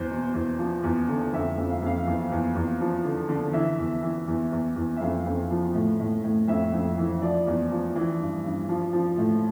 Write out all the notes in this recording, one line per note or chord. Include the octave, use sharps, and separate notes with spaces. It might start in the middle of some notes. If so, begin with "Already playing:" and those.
Already playing: E2 C5
B2
E2
F3
E2
D3
F2 E5
F2
F5
F2 F5
E2
E2
E2
F3
D3
D3
E3 E5
E2
E3
E2
E2
E2
E5
F2 F5
F2
F3
A2
A2
A2
F2 E5
F2
E3
F3 D5
E2
F3
E3
G2
G2
F3
F3
A2